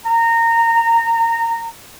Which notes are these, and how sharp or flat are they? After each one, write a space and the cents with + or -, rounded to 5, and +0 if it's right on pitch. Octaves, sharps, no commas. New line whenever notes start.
A#5 -20